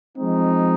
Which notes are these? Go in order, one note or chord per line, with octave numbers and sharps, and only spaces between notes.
F3 G#3 C4 D#4